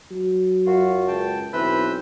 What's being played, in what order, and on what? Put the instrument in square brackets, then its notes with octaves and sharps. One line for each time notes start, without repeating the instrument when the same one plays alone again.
[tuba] F#3
[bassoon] F#2 [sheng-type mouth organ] F4 F#4
[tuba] C#2 [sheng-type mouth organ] G5 A5
[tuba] B1 [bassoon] E3 [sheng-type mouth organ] C4 E6 G6 [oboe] B4